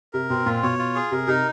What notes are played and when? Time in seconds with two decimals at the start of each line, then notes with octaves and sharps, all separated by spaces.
0.13 C3 A#4
0.30 B2 C4
0.46 A#2 F4
0.63 B2 C#5
0.79 F4
0.95 G#4
1.12 C3 A#4
1.27 C3 D#4